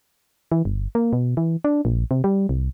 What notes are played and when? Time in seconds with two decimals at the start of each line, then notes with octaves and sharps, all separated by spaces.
0.52 E3
0.65 G1
0.95 A#3
1.13 B2
1.37 E3
1.64 D4
1.85 A#1
2.11 C3
2.24 G3
2.49 C2